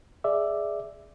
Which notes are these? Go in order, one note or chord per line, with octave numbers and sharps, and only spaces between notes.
G#4 D5 E5